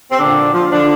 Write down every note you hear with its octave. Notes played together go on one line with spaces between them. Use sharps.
C4
A#2 D3 D4
F3
F3
D3 F3 D4